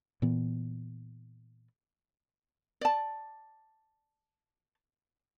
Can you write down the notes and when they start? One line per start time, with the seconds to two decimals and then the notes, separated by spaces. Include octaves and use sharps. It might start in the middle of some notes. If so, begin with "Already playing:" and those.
0.22 A#2 E3 B3
2.81 D5 A5